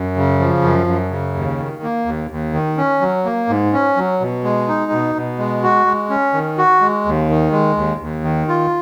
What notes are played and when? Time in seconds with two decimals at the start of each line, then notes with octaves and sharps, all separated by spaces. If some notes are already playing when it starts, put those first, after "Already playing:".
Already playing: F#2
0.16 C#3
0.40 F3
0.63 F#2
0.87 F#2
1.11 C#3
1.34 D#2
1.58 D#3
1.83 A#3
2.06 D#2
2.30 D#2
2.53 D#3
2.77 C#4
3.01 F#3
3.25 A#3
3.49 G#2
3.73 C#4
3.96 F#3
4.20 B2
4.44 G#3
4.68 D#4
4.92 B2
5.15 B2
5.39 G#3
5.63 F#4
5.86 G#3
6.09 C#4
6.33 D#3
6.58 F#4
6.81 G#3
7.06 D#2
7.29 D#3
7.52 G#3
7.77 D#2
8.00 D#2
8.24 D#3
8.48 F4